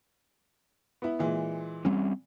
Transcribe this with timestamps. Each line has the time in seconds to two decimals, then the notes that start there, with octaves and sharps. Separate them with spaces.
1.02 B3 E4
1.19 A#2 E3 G#3
1.85 G3 C4 C#4